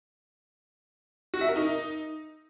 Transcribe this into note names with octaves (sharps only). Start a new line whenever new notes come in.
F#4
E5
A#4
D#4